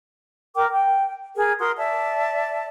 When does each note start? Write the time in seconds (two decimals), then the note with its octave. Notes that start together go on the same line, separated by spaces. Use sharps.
0.55 A#4 G5 D6
0.70 G5
1.35 G#4 A#4
1.59 F#4 A#4 C6 D#6
1.76 D5 E5 A5